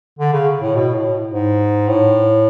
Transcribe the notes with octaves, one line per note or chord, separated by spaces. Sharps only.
D3
C#3
A2
B2
A2
G#2
A2